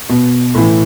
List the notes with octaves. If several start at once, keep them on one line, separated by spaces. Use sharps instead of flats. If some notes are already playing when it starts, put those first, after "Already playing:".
B2
A2 E3